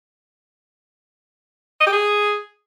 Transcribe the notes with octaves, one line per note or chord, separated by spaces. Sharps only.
D#5
G4
G#4